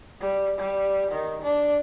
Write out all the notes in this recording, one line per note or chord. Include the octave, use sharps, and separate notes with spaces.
G3
G3
D#3
D4